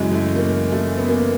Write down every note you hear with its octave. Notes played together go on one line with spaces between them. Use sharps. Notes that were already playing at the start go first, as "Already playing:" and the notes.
Already playing: F#2 C#3 E3 G#3
A3
A#3
A3
B3
A#3